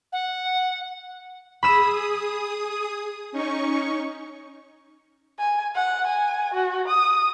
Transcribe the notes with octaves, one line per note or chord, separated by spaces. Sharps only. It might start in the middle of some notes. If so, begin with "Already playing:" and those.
F#5
G#4 B5 D#6 E6 E7
C#4 D#4 C#6
G#5
F#5
G#5
F#4
D#6